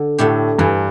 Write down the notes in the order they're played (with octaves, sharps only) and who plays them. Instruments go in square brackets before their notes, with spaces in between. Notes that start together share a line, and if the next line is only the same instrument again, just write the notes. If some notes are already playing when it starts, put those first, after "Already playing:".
Already playing: [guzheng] D3
[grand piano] A2 [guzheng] A3 D4 G4
[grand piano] G2 [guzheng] E3